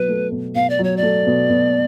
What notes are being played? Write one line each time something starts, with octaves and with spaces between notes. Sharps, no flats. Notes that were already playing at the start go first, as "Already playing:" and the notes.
Already playing: B2 F#3 B4
A3
B2
B2 F5
D5
F#3
C#5
D5
A3
B2
B2